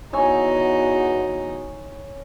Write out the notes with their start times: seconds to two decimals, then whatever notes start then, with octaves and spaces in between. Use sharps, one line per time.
0.13 E2 D#4 F#4 C#5 G#5 E6